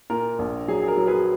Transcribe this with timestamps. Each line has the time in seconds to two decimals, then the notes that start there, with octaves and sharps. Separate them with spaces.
0.10 A#2 A#4
0.39 A#1
0.68 F#3 G#4
0.82 G#4
0.88 A#4
0.97 F#3
1.07 G#4 B4